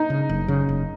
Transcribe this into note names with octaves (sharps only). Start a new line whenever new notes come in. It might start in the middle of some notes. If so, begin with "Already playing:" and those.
Already playing: D#4
C#3
F#1
C#3
F#1